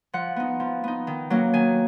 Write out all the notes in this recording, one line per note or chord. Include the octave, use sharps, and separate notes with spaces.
F3 F#5
B3 D#4
F3
B3 D#4
D#3
F#3 A#3 C#4
D#3 G#5